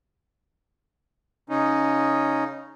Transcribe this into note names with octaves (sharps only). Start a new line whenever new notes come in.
C#3 C#4 D#4